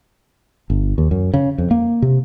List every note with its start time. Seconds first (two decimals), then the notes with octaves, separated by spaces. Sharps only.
0.70 G1
0.98 D#2
1.11 F#2
1.34 C#3
1.58 F2
1.71 A#3
2.02 C3